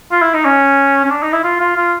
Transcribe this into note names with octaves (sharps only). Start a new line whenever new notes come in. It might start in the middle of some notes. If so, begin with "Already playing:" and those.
F4
E4
D#4
C#4
C#4
D4
D#4
E4
F4
F4
F4